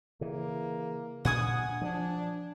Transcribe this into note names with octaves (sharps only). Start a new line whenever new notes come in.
C#3 E3 A#3
A#2 D4 F#5 G#5 D#6
F3 D4